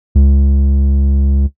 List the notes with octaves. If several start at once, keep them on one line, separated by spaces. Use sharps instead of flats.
C#2